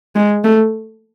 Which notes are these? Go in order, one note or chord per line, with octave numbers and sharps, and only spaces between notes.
G#3
A3